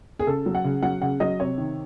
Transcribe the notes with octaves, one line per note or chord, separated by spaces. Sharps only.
G#4
C#3 A4
F#3
F#5
C#3
F#3 F#5
C#3 F#5
F#3 D#5
C3 C#5
D#3